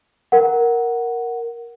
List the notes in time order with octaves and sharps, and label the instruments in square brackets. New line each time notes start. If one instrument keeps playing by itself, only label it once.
[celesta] A#4 F#5